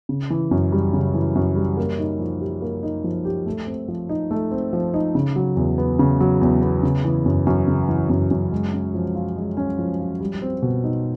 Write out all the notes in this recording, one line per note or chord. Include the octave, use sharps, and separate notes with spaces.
C#3
E3
F#2
G3
C#3
E3
F#2
G3
A#3
D#4
F3
G4
A#3
D#4
F3
G4
A3
C4
F3
D#4
A3
C4
F3
D#4
C#3
F#3
E2
B3
C#3
F#3
E2
B3
C#3
E3
F#2
F#2
C#3
E3
F#2
F#2
G#3
C#4
F3
F4
G#3
C#4
F3
F4
G3
C4
B2
D#4